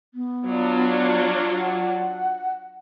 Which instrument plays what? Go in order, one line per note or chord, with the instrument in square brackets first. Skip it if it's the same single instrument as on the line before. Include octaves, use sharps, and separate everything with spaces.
[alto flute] B3
[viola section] F#3 D4 F4
[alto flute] F#5